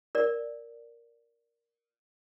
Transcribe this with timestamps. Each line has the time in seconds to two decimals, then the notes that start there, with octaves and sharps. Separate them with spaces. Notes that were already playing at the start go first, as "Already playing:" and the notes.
0.15 A#4 D5